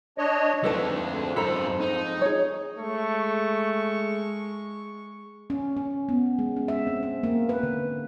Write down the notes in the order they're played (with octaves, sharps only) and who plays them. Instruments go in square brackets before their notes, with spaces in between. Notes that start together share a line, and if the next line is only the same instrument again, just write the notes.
[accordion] D4 C#5 D#5
[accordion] F2 G#2 [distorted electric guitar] A3 D4 [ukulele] A4 B4 A5
[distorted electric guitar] F#2 B5 [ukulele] A4 C5 A#5
[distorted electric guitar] D#4
[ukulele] G#4 C#5
[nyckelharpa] G#3 C#6 [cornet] A3
[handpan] C#4
C#4
B3
G#3
C#4
E5
C4
C4
A#3
B4
D3